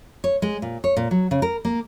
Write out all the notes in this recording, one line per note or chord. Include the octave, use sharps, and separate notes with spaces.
C#5
G#3
A#2
C#5
A#2
F#3
C#3
A#4
A#3